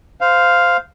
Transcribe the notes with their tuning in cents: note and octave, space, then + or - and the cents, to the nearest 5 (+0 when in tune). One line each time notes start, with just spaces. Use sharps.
C5 -15 F5 +0